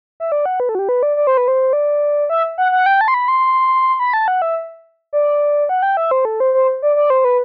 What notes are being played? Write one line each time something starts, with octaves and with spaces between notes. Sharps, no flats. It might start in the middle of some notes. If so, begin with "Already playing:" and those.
E5
D5
F#5
B4
A4
F#4
G4
B4
D5
D5
C5
B4
C5
D5
E5
F#5
F#5
G5
A5
C6
B5
C6
B5
A5
F#5
E5
D5
F#5
G5
E5
C5
A4
C5
C5
D5
D5
C5
B4